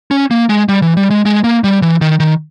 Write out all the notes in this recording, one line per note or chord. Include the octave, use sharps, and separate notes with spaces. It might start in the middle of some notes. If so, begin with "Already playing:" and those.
C#4
A#3
G#3
G3
E3
G3
G#3
G#3
A#3
G3
E3
D#3
D#3